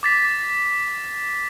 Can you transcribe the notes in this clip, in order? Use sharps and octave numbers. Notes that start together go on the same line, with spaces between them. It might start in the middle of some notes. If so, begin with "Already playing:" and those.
D6 A6 B6